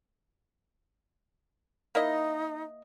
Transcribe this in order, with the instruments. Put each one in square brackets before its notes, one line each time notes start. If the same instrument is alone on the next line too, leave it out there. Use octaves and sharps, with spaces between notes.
[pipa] A#3 E4 D#5 [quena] D#4